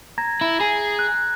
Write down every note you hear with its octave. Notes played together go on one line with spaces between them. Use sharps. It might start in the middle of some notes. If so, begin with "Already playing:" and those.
A#5 G#6 A#6
E4
G#4
F#6